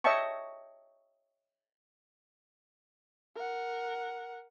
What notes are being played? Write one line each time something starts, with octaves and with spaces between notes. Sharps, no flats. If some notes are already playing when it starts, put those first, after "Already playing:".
C#5 D#5 E5 G5 A5 C#6
A#4 F#5